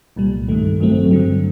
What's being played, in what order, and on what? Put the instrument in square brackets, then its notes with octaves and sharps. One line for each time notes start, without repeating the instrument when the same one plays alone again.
[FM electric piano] C2 A#2 G3
G2 D#3 A3
A1 G2 F#3 A3 C4
G2 D3 F#3